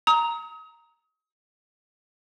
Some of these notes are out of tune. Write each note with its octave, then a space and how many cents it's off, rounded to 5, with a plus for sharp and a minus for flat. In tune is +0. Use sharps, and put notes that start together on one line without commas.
A#5 +0 D#6 +35